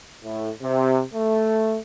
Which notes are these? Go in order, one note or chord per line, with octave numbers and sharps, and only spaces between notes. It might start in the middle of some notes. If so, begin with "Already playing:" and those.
A2
C3
A3